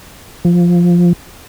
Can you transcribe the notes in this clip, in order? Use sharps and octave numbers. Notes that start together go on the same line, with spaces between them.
F3